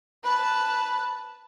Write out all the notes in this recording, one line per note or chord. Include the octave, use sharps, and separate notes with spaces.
B4 A5